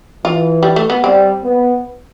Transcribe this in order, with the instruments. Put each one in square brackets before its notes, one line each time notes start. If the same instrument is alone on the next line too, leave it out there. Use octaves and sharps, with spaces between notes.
[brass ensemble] E3 [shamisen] F4
[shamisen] G3
A3
B3
[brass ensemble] G3 [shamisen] C4
[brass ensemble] B3